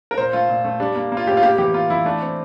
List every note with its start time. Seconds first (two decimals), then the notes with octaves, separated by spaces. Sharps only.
0.11 A#4
0.18 A#2 C5
0.33 A3 F4
0.49 A#2
0.64 A3
0.80 G3 D4
0.96 A#3
1.12 A#3
1.17 F4
1.27 A2 G4
1.37 F4
1.42 A#3 G4
1.58 E3 G4
1.74 A#3 F4
1.90 E3 E4
2.05 A3 D4
2.22 C4